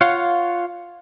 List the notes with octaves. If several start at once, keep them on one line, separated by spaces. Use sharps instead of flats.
F4 C#5 F5 F#5